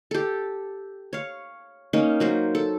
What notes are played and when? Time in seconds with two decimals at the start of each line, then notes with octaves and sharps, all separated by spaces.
0.11 G4 A4
1.13 C#5 F5
1.93 A#3 C#4 D#4
2.20 F#3 A#3 C5
2.55 A4